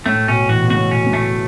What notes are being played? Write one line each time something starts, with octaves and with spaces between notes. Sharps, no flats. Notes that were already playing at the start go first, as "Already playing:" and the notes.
A2 A3
B2 C#4
B2 E3 F#4
B2
A2 C#3 F#4
B2 C#4
A2
B2 A3